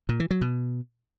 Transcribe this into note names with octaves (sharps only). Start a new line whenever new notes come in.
A#2
E3
F#3
B2